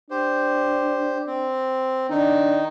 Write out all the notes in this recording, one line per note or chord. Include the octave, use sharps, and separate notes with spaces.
D4 G4 C5
C4
D#3 D4 D#4